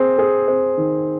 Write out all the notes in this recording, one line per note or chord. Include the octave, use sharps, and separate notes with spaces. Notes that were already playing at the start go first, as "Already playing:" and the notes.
Already playing: C4 G#4
G#4
C4
D#3